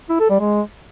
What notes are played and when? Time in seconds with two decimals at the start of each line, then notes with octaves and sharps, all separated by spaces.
0.10 E4
0.20 A4
0.30 G3
0.40 G#3